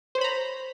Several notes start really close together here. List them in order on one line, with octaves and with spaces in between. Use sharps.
C5 C#5 B5 A#5